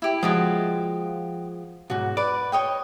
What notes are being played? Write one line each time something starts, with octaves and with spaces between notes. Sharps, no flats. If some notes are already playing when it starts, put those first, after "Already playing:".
E4 G4
F3 G#3 F#4 G4 D#5
B1 G#2 F#4
B4 D5
C#5 D#5 G5